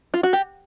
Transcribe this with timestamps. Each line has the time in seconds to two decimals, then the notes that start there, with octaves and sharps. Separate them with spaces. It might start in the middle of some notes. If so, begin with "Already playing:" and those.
0.14 F4
0.23 F#4
0.33 G4